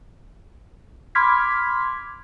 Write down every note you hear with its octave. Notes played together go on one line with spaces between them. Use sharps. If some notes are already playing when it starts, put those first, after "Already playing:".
B5 C6 D6 F6 G#6 B6